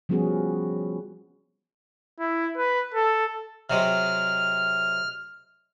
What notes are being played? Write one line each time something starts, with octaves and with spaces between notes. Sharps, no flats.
F3 G3 B3 C#4 F#4 G#4
E4
B4
A4
C3 F#3 G#3 F6